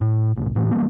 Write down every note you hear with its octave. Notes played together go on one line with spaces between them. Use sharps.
A2
G1 C2 A2
F#1 A2 E3
E3 G3 A#3 B3